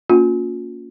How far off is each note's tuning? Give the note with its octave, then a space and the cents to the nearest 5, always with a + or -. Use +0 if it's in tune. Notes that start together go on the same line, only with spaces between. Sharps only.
A#3 +0 C#4 +30 F4 +35